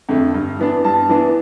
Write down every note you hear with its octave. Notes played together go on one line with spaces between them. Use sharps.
F2 D3 A3
G2
E3 B3 D4
G2 A5
E3 B3 D4